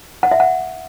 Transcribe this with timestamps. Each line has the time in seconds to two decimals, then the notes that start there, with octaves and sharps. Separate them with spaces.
0.23 F#5
0.31 E5
0.40 F#5